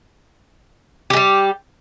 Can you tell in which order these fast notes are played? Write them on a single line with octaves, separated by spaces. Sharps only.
G4 G#3 G3